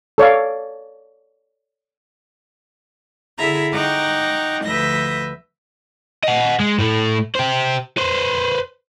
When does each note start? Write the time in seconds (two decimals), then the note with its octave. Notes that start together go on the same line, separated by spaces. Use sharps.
0.18 A4 C#5 D5 F5
3.38 D3 E4 G#4 E5 A#5
3.72 D#4 F#5 G5 A#5 C#6 D6
4.64 D2 F3 B4 E5 G6 A#6
6.23 D#5 F#5
6.60 G#3
6.79 A2 A3
7.35 G4 C5
7.97 B4 C5